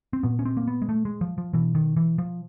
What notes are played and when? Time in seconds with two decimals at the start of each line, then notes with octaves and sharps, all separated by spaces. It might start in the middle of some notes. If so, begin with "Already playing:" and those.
0.13 C4
0.23 A#2 B3
0.39 C#4
0.45 C4
0.57 A#3
0.68 B3
0.82 G#3
0.89 A3
1.05 G#3
1.21 F3
1.38 F3
1.53 B2 E3
1.75 D#3
1.97 E3
2.18 F3